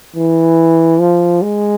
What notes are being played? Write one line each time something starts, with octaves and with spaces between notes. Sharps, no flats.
E3
F3
G#3